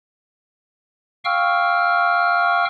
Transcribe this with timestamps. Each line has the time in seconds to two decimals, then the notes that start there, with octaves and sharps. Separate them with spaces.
1.25 F5 G5 C#6 E6 F6